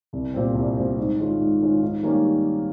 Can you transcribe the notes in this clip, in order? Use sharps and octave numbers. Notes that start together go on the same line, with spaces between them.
C2
A#2 G3 C4
C2
A#2 G3 C4
G#2
D#3 G#3 C#4 F4
G#2
D#3 G#3 C#4 F4
G#2
D#3 G3 A#3 C#4